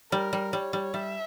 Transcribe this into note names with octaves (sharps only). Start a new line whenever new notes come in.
G3 A#4
G3
G3 C#5
G3
G3 E5